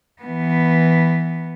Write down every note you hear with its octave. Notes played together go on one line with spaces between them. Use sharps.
E3 B3